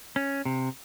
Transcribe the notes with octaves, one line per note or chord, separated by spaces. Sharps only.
C#4
C3